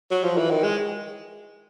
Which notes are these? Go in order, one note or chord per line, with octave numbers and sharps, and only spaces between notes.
F#3
F3
E3
D#3
G#3